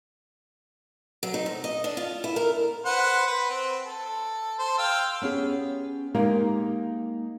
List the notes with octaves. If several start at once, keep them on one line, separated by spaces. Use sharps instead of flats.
F#3
D#4
C3
D#5
D4
F4
E4
A#4
B4 C5 F#5
B4
C4
A4
A4 C5
F5 G5 E6
B3 C#4 G4 G#4
G#3 A#3 D#4 G4 A#4 F5